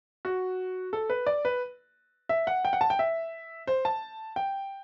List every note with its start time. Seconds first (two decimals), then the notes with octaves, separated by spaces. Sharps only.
0.25 F#4
0.93 A4
1.10 B4
1.27 D5
1.45 B4
2.29 E5
2.47 F#5
2.65 G5
2.73 F#5
2.81 A5
2.90 G5
2.99 E5
3.67 C5
3.85 A5
4.36 G5